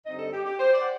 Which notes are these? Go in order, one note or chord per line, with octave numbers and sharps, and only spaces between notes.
G2 D3 G3 C4 D#4 D#5
A4
G4
G4
C5
D5
F#5